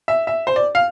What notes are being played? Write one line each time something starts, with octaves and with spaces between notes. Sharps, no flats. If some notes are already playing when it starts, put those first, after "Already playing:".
E5
E5
C5
D5
F5